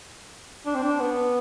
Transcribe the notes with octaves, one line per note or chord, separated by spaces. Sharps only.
D4
C4
D4
B3